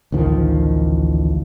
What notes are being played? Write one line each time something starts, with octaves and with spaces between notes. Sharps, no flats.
A1 D2 D#3 F3